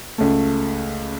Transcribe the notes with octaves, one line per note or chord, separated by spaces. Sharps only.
C#2 A3